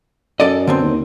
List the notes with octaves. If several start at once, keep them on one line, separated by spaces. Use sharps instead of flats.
F#2 A4 D5 D#5
D3 B3 C4
D#2